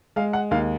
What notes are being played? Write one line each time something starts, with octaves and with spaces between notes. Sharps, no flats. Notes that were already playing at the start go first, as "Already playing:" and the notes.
G#3 F5
F#5
D#2 F5